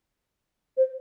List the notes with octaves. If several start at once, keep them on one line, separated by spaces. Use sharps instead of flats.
C5